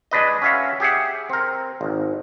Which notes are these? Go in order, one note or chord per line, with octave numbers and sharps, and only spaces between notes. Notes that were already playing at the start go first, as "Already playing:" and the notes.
G#3 D4 B4 D#5
C#4 F#4 E5 F5
G4 G#4 E5 F#5
C4 A#4
G#1